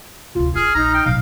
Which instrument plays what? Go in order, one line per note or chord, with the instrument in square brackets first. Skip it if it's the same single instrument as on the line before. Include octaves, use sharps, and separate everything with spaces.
[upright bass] F1 D2 [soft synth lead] F4
[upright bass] F4 [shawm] G#4 [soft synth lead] F6
[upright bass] A#1 [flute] D#4 [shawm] A#5
[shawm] G5
[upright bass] B1 A#2 [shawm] F5